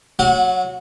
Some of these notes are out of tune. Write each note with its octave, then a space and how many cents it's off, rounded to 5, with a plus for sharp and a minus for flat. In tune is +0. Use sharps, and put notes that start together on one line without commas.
F#3 +0 F#4 -15 F#5 -40